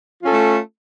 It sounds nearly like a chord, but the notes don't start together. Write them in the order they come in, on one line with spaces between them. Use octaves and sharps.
F4 C#4 A4 A3